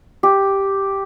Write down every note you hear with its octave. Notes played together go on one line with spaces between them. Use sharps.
G4